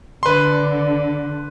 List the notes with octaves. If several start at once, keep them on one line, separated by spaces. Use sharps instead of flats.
D3 B4 C6